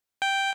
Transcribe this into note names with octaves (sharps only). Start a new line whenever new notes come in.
G5